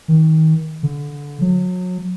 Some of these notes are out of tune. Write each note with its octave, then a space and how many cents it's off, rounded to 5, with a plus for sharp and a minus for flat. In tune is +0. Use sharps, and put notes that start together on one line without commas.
D#3 +30
D3 -20
F#3 -30